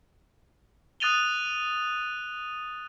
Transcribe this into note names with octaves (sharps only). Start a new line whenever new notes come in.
D#6 F#6 A6 D#7 F7 G7